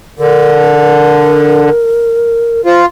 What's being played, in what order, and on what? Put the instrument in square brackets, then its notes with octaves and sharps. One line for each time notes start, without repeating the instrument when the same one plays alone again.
[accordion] D3 [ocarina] A#4
[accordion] F4 [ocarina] C5